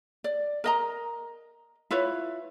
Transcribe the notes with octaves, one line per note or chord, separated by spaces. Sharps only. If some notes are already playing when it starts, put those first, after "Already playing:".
D5
A#4 D#5 A#5
E4 F4 B4 C#5